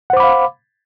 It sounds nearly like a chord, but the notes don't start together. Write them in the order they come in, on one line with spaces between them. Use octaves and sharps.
F#5 C5 D6 B5 F5